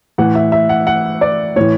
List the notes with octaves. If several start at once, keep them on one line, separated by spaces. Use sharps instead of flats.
A2 E3 F#5
E5
E5
F#5
F#5
D5
A2 E3 C#5